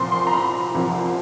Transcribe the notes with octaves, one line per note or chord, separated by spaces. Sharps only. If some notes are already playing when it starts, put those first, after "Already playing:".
Already playing: C2 A#2 F3 C6
C6
A#5
B5
C2 A#2 F3